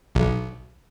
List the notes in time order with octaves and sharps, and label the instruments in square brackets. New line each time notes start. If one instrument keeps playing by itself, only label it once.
[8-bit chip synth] B1